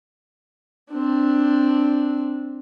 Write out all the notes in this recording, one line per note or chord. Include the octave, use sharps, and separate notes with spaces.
C4 D4